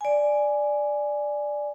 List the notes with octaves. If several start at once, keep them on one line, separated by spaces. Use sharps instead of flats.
D5 G#5